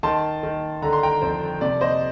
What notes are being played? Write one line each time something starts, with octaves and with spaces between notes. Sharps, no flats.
D#3 A5 C6
D#3
D3 A#5
C6
G5 A#5
F2 C5
C3 D5
C5 D#5